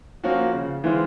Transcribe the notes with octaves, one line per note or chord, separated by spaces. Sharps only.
F3 A#3 C#4 F#4
C#3
E3 G#3 C4 F4